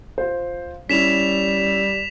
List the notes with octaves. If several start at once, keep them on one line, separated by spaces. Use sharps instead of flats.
F4 C5
G3 C#4 E4 B6 E7 F7